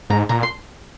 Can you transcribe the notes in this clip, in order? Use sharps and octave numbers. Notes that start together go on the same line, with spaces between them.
G#2 A#5
A#2 A#5
C6